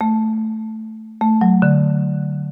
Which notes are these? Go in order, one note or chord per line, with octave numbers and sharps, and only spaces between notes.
A3
A3
F#3
D3